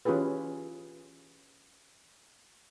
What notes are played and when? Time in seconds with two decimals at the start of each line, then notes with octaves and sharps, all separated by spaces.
0.05 E3 C#4 F4 G4 G#4 B4